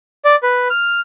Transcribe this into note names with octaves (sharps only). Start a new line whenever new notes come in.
D5
B4
F6